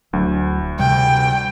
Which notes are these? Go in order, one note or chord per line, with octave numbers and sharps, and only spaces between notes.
D1 D2 F#3
C3 G3 G5